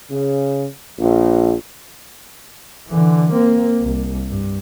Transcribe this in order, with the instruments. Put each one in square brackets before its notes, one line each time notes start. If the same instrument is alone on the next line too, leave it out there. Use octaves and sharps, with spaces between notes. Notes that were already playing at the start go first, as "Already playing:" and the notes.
[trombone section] C#3
A#1
[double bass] D3 E3
A#3 C4
C2
G2